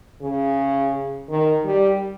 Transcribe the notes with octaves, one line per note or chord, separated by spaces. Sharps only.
C#3
D#3
G3